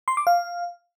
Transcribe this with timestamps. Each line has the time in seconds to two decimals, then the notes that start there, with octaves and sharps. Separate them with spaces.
0.08 C6
0.17 D6
0.27 F5